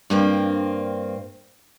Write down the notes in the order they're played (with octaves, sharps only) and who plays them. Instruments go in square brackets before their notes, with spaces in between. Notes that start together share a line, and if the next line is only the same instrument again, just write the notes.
[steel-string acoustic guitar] G2 A#3 C4